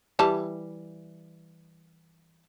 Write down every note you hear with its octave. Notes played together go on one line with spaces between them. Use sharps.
E3 G3 A5